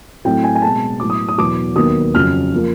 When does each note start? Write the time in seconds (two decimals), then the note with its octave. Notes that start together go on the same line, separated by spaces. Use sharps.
0.25 A2 F#3 A3 C4 G5
0.44 G#5
0.55 G#5
0.62 B2 G#3 C4 A5
1.00 A2 F#3 B3 D6
1.10 D#6
1.29 D#6
1.38 E2 B2 F#3 D6
1.76 D#2 D#3 F#3 B3 D#6
2.14 F2 C#3 F#3 F6
2.54 F3 A#3